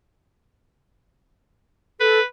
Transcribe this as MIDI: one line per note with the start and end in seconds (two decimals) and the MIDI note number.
2.00 2.19 69
2.00 2.24 71